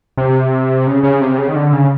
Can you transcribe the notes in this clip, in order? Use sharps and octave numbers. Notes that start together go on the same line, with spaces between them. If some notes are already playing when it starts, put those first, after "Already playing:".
C3
C#3
C#3
C3
C#3
D#3
D3
C#3